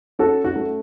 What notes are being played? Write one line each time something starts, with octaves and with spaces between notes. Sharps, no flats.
C#4 F#4 A4
F#4
A3